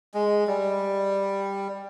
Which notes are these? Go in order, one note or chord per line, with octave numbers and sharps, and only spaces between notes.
G#3
G3